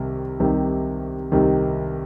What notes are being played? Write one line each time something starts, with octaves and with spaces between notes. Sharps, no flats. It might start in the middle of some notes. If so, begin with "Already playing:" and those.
Already playing: C2 C3 D#3
C2 C3 D#3
C2 C3 D#3